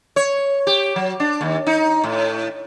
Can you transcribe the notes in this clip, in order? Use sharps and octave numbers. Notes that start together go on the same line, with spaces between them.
C#5
G4
F#3
D4
D#2
D#4
A2